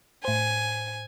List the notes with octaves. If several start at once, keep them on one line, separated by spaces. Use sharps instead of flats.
A2 C5 G#5